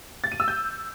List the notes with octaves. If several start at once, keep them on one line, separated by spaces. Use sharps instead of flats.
A6
D#7
E6
G6